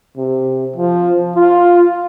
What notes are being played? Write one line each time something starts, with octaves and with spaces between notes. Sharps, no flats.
C3
F3
F4